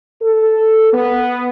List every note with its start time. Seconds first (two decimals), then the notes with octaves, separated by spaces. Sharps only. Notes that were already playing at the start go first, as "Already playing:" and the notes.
0.22 A4
0.93 B3